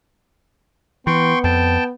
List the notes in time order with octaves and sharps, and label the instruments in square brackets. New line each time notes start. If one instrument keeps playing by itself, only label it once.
[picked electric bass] E3 [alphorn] B3 [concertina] G5 C6 C#6
[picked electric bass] F2 [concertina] G5 A5